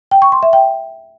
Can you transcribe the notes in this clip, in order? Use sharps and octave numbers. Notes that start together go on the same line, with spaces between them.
G5
C#6
C6
E5
G5